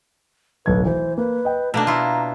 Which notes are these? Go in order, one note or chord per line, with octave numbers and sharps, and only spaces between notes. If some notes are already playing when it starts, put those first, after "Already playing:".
D1 B1 B4 G#6
E3 C5
A#3 B4
D#5 G5
B2 A3 A#3 D4
E4 F4 A#5